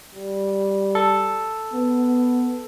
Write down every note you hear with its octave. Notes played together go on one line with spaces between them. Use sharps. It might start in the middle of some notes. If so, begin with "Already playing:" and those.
G3
A4
B3